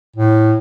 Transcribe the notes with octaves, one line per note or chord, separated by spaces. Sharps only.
A2